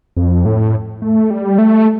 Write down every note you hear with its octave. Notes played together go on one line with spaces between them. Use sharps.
F2
A2
A3
G3
A3